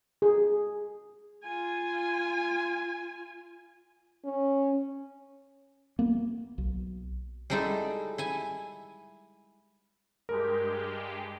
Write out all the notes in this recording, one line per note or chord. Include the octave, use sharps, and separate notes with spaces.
G#4
F4 G#5
C#4
A#3 B3
B1
G3 G#3 D#4 E4 A4
E4 G#5
G2 G#3 G4 A#4